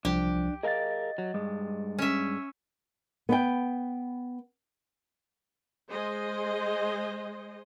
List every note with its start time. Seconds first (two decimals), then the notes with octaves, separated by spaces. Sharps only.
0.05 C2 F3 D4 G4
0.63 G#4 A#4 D#5 F5 A6
1.18 F#3
1.34 G2 G#3
1.99 C#4 E5
3.29 B3 B4 G5
5.89 G#3 C5 D#5